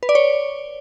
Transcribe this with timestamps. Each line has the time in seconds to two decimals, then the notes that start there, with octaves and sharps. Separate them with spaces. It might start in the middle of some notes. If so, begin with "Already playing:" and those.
0.03 B4
0.09 D5
0.15 C#5